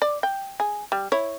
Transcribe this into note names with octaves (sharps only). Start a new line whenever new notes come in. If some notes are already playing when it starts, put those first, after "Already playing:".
D5
G5
G#4
G3
E4 C#5